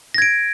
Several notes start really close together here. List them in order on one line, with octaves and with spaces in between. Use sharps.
A#6 G#6 D7